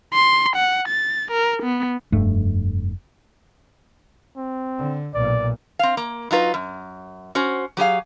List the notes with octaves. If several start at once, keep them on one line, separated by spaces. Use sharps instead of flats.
C6
F#5
A6
A#4
B3
F1 G2 A3
C4
D3
B1 A#2 D5
C4 F5
A#3
F#3 D#4 F4 B4
F#2
C#4 F#4 C5
F#3 G4 G#4 F5